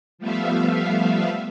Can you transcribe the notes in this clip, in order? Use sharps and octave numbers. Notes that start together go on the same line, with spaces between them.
F3 G3 A3 B3 E5 F5